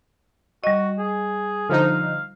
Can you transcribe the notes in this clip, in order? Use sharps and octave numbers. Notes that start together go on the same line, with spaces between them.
G3 F#4 D#5
G#4
D3 F3 D#4 F5